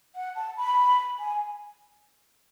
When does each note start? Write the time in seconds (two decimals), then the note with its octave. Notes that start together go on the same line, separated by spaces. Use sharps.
0.15 F#5
0.35 A5
0.57 B5
1.19 G#5